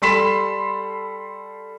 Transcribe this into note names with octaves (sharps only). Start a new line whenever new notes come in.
G3 A4 B5 C6 B6 E7